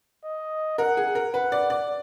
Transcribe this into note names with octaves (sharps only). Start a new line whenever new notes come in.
D#5
A#4 F#5
G#4
A#4
B4 F#5
D5
D5